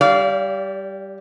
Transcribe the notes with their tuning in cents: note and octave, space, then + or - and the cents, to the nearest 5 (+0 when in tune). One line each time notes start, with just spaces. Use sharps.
G3 +0 D5 -35 F5 +0